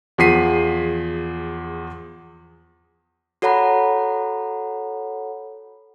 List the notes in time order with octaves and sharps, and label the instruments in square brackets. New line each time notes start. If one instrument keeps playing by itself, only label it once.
[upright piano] E2 F3 G#4 B6 C7 D#7
[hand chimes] F#4 A4 C#5 F#5 A#5 B5